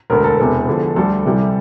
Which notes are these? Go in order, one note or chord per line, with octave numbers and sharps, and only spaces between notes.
E1 D2 D3 A#4
A4
E1 E2 C3 A4
E2 D3 F3
D2 D3 G3 A4
C2 C3 E3 G3